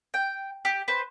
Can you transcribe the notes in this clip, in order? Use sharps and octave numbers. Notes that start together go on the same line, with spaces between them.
G5
G4
B4 C5